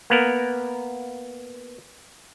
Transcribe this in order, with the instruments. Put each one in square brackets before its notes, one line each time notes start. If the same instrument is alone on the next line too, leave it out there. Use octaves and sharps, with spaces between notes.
[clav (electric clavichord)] A#3 B3 A#4